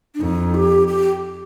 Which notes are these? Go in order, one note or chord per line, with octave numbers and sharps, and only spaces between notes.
D4
F2 D#4
G4
G4